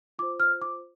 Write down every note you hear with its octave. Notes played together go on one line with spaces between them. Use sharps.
F4 C5 D6
F6
D6